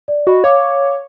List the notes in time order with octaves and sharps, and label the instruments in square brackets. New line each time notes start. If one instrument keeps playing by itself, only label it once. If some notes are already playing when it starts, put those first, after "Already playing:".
[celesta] D5
[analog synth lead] F#4 [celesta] D#5 B5
[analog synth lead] C#5 [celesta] F5 D6